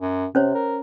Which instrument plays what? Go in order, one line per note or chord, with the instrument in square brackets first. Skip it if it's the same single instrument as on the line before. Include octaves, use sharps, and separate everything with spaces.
[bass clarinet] F#2
[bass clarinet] C3 [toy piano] C#4 C5 C#5
[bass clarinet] A#4